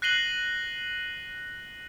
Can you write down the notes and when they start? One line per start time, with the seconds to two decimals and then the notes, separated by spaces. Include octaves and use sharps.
0.02 F#6 A#6 C7 D#7 F#7 G7